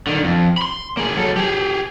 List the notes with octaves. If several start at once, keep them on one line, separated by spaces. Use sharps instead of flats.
D3 D#3
F2
B5 C6
A#3 G#4
F#3 A4
G4 G#4